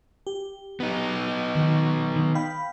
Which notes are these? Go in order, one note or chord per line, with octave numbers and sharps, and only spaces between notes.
G4
B3 D#4
D#3
D#3
F5 G5 B5